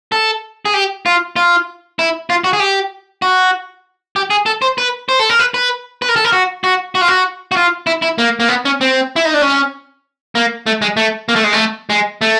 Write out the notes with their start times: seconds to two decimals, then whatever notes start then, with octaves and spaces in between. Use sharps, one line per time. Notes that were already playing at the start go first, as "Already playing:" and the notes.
0.12 A4
0.65 G#4
0.74 G4
1.06 F4
1.36 F4
1.99 E4
2.30 F4
2.44 F#4
2.53 G#4
2.60 G4
3.22 F#4
4.16 G4
4.30 G#4
4.46 A4
4.62 C5
4.78 B4
5.09 C5
5.19 A4
5.30 A#4
5.39 B4
5.54 B4
6.02 B4
6.09 A#4
6.16 A4
6.25 A#4
6.33 F#4
6.64 F#4
6.95 F#4
7.01 F4
7.08 F#4
7.52 F#4
7.57 F4
7.87 E4
8.02 E4
8.18 A#3
8.40 A#3
8.49 B3
8.65 C#4
8.81 C4
9.16 E4
9.25 D#4
9.34 D4
9.42 C#4
10.35 A#3
10.66 A3
10.82 G#3
10.97 A3
11.29 A#3
11.36 A3
11.44 G#3
11.53 A3
11.90 G#3
12.21 A3